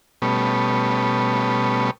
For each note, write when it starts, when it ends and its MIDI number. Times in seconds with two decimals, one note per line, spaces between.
0.22 1.91 47
0.22 1.91 55
0.22 1.91 57
0.22 1.91 59
0.22 1.91 61